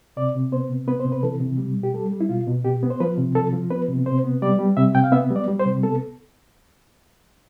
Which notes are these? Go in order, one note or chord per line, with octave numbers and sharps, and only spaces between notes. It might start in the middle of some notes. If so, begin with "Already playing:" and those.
C3 D5
C3
B3 C5
C3
B3 B4
C5
C3
B4
E3 A4
C3
G3
B2
G4
G3 A4
G3
E4
B2 F4
B2
B2 G4
B3
C5
F3 B4
C3
F3 A4
F3
B3 B4
C3
C3 C5
B3
G3 D5
G3
C3 E5
C3 G5
F5
B3 E5
G3
D5
G3
C5
C3
B3 A4